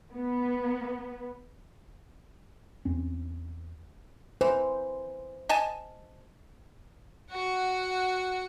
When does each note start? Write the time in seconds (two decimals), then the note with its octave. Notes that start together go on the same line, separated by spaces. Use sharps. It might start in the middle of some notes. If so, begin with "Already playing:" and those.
0.14 B3
2.85 E2 C4 C#4
4.41 E3 C5
5.49 D#5 G#5 A5
7.30 F#4 F#5